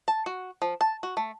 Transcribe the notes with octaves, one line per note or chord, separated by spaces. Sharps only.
A5
F#4
F3
A5
F#4
A3